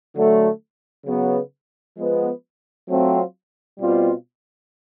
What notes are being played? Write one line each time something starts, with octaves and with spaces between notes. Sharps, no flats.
D3 F#3 A3
C#3 F#3 B3
F3 G#3 B3
F#3 A3 C4 F4
B2 G3 C4 F4